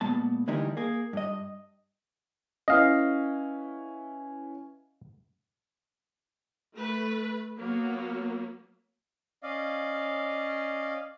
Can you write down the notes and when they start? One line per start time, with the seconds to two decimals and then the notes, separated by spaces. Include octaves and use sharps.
0.01 A#2 G#3 B3 A5
0.48 D3 E3 G3 A3 D#4 A#4
0.77 A#3 G#4
1.13 G2 D#5
2.68 C#4 E4 B4 D#5 F5
6.76 A3 B4
7.59 F#3 A#3 B3
9.42 C#4 D5 D#5 F5